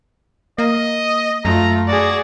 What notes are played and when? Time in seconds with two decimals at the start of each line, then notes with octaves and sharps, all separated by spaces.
0.58 A#3 D#5
1.45 F#2 A3 F4 A#5
1.88 F#4 G#4 D5